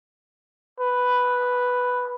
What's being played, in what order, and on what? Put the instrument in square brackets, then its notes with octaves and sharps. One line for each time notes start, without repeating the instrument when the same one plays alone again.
[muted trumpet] B4